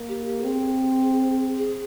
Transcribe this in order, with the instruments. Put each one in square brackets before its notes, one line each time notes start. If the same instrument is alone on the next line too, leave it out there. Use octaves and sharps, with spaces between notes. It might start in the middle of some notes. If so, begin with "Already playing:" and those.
Already playing: [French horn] A#3
[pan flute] G4
G4
A4
[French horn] C4 [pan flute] G#4
[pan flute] G#4